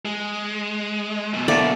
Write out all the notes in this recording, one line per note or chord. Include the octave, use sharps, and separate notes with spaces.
G#3
F#2 B2
D3 A3 A#3 D5